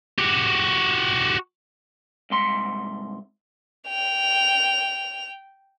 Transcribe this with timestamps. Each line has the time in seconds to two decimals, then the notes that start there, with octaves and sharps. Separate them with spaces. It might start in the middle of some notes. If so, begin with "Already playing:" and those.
0.19 F#4 G4
2.30 C2 G#2 C6
3.88 G5 F7